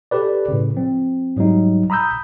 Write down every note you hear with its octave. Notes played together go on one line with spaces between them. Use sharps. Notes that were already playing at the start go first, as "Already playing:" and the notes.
G4 A4 B4 D5
A2 C#3
F3 C4
G#2 F#3 G3 D#4
A#5 B5 D#6 E6 G6